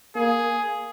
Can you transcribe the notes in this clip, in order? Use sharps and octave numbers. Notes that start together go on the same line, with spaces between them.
A#3 G#4